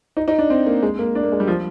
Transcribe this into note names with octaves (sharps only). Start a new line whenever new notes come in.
D#4
D#4
D4
C4
A#3
G#3
A#3
D4
A#3
G#3
G3
F3